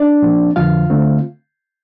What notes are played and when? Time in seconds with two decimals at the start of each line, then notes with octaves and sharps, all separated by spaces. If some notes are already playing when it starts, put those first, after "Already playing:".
Already playing: D4 D5
0.22 A#2 F3 C4
0.56 F2 D3 F3 F4 F5
0.90 D3 A3 C4